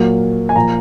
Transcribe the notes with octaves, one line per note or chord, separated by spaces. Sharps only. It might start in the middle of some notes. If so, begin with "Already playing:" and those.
Already playing: A#2 F#3 A#3
G#5
A#2 F3 A#3 A#5